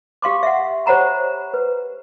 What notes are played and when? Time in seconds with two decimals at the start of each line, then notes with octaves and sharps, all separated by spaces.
0.22 G4 F5 C6 D6
0.43 E5 F#5
0.86 G4 C5 C#5 F#5 A#5 B5
1.54 B4